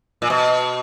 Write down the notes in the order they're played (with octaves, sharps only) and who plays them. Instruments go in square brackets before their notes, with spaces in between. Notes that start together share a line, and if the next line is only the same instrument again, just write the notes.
[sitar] A#2
B2